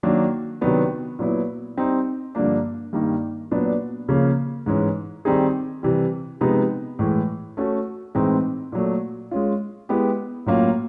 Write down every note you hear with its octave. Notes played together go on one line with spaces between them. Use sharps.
D#3 F#3 A#3 D4
C3 D#3 F#3 B3 D4
A#2 F#3 B3 E4
G3 C4 D#4
G2 D3 F3 A#3 D4
G2 D#3 G3 A#3 D#4
A#2 F#3 B3 D4
C#3 F3 A#3 C#4
G#2 E3 G#3 C#4
D#3 G3 C4 D#4 G#4
C3 E3 G3
C3 F3 G#3 B3 D#4
A2 E3 G#3
A3 C#4 F#4 A4
A2 E3 G#3 C4 D#4
A#2 F#3 A3
G#3 C#4 F4
G#3 B3 E4 G4
A2 F#3 A#3 C#4 F4